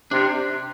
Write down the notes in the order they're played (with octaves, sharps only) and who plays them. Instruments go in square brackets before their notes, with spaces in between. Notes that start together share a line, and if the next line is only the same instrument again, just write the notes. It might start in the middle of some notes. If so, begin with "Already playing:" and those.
[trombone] C3 [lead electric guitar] D4